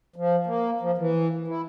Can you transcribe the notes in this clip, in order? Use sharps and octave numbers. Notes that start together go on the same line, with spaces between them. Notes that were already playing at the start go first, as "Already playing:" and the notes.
F3
A#3
F3
E3
E4